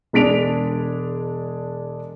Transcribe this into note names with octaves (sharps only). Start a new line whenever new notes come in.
E1 G#3 D4 B6 D7 F7